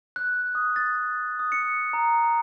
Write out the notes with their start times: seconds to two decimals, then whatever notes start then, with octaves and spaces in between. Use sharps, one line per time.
0.16 F#6
0.55 D#6
0.76 A6
1.39 D#6
1.52 C#7
1.93 A#5